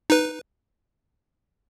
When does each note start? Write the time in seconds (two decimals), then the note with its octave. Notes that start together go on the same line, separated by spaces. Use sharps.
0.10 D#4 B4